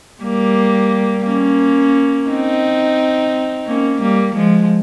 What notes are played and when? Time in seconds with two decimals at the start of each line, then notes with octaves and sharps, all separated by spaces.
0.23 G3 A#3
1.26 A#3 C#4
2.29 C4 D#4
3.67 A#3 C#4
4.01 G3 A#3
4.35 F3 G#3